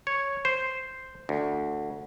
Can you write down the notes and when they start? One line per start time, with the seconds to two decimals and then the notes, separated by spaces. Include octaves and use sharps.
0.07 C#5
0.45 C5
1.29 D2